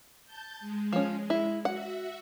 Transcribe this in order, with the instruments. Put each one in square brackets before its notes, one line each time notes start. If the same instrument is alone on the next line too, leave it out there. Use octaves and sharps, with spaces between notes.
[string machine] A5 G6
G#3
[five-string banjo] F3 C#4
E4
[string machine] F#4 E5 [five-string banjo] F#5